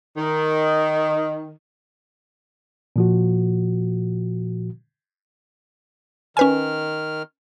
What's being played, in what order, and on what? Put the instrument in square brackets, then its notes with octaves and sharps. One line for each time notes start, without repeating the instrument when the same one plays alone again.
[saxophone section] D#3
[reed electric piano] A#2 F3 F#4
[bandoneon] D#3 F6 [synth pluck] C#4 B4 G#5